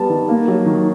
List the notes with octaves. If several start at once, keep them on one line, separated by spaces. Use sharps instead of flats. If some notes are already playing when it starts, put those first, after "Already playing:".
Already playing: G3 B3 A5
D#3
A#3
F#3
D#3